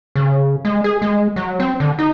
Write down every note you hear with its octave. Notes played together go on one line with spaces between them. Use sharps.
C#3
G#3
G#4
G#3
F#3
C4
D3
D#4